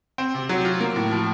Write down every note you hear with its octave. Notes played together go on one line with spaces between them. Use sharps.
C4
C3
F#3
F4
A#3
A2
F3